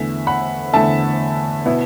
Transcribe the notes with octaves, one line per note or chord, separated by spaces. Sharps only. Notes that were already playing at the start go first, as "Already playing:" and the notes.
Already playing: E2 D3 A3 E4 E5
F#5 B5
E2 D3 A3 E4 E5 A5
B2 B3 E4